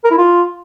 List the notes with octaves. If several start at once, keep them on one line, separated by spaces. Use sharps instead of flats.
A#4
E4
F4